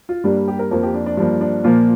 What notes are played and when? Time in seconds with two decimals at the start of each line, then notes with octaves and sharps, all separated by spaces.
0.09 F4
0.24 G2 G3 A#3 D4
0.48 G4
0.59 A#4
0.71 F2 F3 A#3 A#4
0.83 G4
0.94 D4
1.06 D4
1.17 G2 F3 A#3 D4
1.41 D4
1.64 A#2 F3 A#3 F4